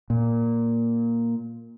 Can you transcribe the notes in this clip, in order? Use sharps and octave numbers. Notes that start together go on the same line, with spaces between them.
A#2